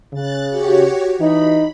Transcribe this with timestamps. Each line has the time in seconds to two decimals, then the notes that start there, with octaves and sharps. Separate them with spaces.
0.13 C#3 F#6 A6
0.51 F#4 G4 C#5
1.21 E3 D#4 B5